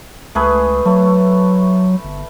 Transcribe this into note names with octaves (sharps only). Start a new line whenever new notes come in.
C#2 A3 G#4 B4
F#3 A3
G1